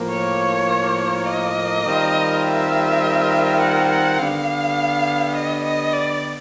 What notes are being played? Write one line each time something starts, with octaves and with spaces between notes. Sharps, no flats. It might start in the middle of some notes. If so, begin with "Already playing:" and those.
Already playing: A2 F3 A#3
C#5
D#5
D#3 G3 C4 F4 A#4
E5
F#5
F#5
D3 G3 B3 F5
D#5
D#5
D5